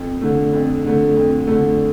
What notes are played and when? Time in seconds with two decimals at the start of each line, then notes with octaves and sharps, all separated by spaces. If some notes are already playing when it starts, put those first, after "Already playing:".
Already playing: F2
0.21 D3 A3
0.53 F2
0.84 D3 A3
1.17 F2
1.47 D3 A3